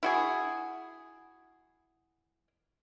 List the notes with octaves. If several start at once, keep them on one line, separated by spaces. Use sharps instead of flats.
E4 F#4 G#4